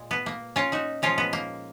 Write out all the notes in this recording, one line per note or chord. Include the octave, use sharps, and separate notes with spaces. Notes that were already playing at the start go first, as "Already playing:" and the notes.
Already playing: A#2 G#3
B3
A#3
C#4 F4
D#4 F#4
A#2 F3 G#3 C#4 F4
B3
A#3